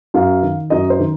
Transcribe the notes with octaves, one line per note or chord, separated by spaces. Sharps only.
F#2 F5
D#3
F#2 D#5
C5
D#3